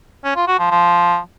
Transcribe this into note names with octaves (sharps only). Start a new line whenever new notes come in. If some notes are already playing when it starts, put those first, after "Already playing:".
C#4
F4
F#4
F3
F3